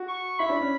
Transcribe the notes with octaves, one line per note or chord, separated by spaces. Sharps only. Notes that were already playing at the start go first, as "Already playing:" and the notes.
Already playing: F#4
C#6
E4 B5
D4
C#4